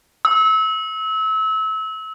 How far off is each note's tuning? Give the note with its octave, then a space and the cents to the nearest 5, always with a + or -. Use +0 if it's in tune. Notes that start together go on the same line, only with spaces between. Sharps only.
E6 -30